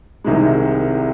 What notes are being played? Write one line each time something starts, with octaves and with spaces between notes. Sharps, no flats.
C2 C3 D#3 G#3